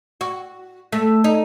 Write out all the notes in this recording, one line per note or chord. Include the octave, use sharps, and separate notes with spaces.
F#4
A3
D#4